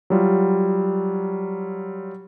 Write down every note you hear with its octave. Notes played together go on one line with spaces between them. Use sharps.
F#3 G3 F4